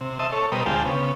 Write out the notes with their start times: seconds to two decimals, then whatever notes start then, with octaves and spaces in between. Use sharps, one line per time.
0.01 C3
0.19 D#5 E5 A5 C6
0.32 A4 C#5
0.52 B2 G3 A#4 C5 D#5 B5
0.66 D2 G#3 F4 C5 G5 A5
0.85 C#3 B3